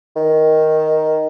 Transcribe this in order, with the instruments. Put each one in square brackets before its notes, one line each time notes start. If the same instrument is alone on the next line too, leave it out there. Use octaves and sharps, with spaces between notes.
[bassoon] D#3